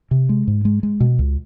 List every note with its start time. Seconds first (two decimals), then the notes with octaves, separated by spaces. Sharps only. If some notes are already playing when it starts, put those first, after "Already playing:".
0.11 C3
0.29 G#3
0.47 G#2
0.65 G#3
0.83 G#3
1.00 B2
1.19 C#2